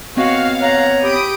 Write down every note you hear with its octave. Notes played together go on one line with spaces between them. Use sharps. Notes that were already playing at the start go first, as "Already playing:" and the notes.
B3 C4 F#4 C#5 D#5 F5
C#5 F#5 A#5
G4 B5 D#6 D7